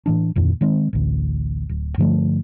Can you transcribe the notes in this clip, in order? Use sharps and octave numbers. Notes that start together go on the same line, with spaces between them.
A2 E3 D4
D1 F2 A#2 D#3
D#3 G#3 C4
A1 D2
D1
G2 D3 F3 A3